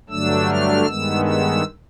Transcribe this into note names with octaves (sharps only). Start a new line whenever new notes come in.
G2 D3 F#3 A3 D4 E6
F6
G2 D#3 G#3 B3 E6
E6